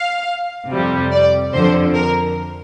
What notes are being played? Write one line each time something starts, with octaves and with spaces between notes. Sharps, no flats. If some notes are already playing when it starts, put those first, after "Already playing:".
Already playing: F5
F2 C3 G3
D5
F2 D3 F3 C5
A#4